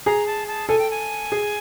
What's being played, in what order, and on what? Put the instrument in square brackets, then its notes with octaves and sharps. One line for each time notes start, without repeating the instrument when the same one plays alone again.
[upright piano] G#4 [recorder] A#5
[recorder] A5
A5
[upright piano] A4 [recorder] G#5
[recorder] G5
G#5
[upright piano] G#4